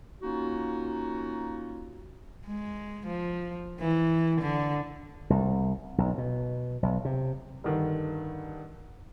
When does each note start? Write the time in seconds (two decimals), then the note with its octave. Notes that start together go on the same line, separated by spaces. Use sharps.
0.22 A#3 C#4 D#4 F4 F#4
2.47 G#3
3.07 F3
3.80 E3
4.41 D3
5.30 C2
5.98 B1
6.18 B2
6.83 B1
7.05 C3
7.64 G2 D3 D#3